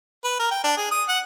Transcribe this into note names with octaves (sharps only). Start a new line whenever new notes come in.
B4
A#4
G5
D4
G#4
D#6
F#5